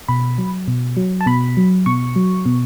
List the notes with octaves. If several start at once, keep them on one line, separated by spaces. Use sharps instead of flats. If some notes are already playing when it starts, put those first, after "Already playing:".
B2 B5
F#3
B2
F#3
A5
B2 B5
F#3
B2 C#6
F#3
B2